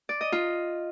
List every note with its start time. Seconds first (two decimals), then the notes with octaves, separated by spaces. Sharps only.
0.09 D5
0.21 D#5
0.32 F4